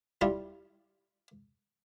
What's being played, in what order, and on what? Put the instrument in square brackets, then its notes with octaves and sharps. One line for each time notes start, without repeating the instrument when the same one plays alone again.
[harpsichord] G3 E4 F4